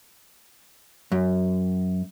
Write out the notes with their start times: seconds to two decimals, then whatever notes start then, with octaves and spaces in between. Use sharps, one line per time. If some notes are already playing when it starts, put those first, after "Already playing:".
1.12 F#2